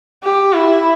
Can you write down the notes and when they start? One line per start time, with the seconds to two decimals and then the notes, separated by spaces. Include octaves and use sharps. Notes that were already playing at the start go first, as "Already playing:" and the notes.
0.24 G4
0.53 E4